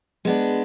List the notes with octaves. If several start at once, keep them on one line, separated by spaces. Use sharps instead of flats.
G#3 B3 D4